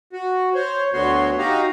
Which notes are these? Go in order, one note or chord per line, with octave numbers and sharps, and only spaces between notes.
F#4
C5 C#5
D2 D3 B3 F#4 C#5 C6
D#4 F#4 G4 D#5 F5 A#5